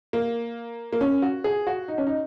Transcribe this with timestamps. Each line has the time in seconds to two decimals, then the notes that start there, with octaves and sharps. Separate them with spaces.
0.13 A#3
0.93 A#3
1.01 C#4
1.22 F#4
1.44 G#4
1.67 F#4
1.88 D#4
1.98 C#4
2.07 D#4